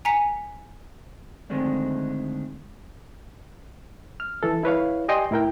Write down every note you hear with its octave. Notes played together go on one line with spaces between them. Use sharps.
G#5 A#5 B6 C#7
D3 D#3 G#3 A3 C4 D4
F6
E3 A4
E4 B4 C#5 F5
G4 D5 D#5 G5 G#5 C6
A2 E4 A#4 G5